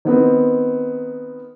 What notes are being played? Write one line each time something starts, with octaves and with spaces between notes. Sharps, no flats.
D#3 B3 C4